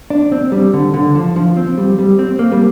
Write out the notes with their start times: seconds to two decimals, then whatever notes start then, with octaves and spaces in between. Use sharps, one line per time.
0.10 D4
0.32 C4
0.52 G3
0.73 D3
0.94 D3
1.15 F3
1.36 F3
1.57 C4
1.78 G3
1.99 G3
2.19 C4
2.39 A#3
2.52 G3